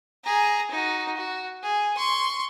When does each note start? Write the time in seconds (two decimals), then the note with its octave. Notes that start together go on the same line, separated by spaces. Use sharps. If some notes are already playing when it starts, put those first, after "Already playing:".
0.24 G#4 A#5
0.71 D#4 F#4
1.16 F#4
1.63 G#4
1.97 C6 C#6